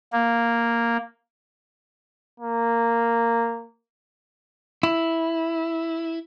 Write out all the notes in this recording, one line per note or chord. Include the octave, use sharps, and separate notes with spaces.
A#3
A#3
E4